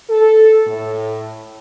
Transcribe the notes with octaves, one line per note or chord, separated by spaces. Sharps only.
A4
A2